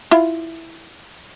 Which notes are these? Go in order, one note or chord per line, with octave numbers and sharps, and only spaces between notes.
E4 F4